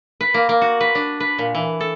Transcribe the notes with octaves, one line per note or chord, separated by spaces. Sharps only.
B4
A#3
A#3
F#4
B4
D4
B4
A#2
E3
A4